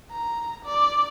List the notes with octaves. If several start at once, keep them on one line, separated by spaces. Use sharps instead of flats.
A#5
D5